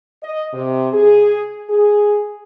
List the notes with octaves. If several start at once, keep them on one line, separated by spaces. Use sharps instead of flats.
D#5
C3
G#4
G#4